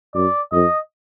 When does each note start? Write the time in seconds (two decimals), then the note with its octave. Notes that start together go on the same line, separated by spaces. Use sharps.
0.14 F#2 D5
0.52 F2 D#5